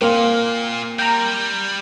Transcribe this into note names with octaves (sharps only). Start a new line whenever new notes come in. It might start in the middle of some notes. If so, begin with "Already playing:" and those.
A#2 A#3 C4 F5
G3 G5 A#5